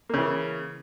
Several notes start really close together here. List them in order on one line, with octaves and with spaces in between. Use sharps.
A#3 C#3 E3